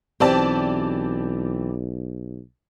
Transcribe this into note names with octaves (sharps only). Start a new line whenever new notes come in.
B1 E3 C4 G4 D5 A5